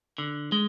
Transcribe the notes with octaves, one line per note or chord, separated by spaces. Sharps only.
D3
G#3